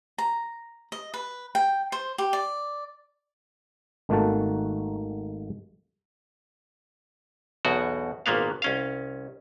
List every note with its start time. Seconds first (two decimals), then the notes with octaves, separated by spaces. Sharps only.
0.18 A#5
0.92 D#5
1.14 B4
1.55 G5
1.92 C5
2.18 G4
2.33 D5
4.09 G#1 D#3 A3 A#3 F#4 A5
7.65 B1 E2 B2 F#4
8.26 G#1 A#2 A#3 B3 F5
8.62 C2 C#4 F5